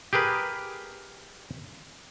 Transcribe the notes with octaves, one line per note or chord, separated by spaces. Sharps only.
G4 G#4 A#4 B4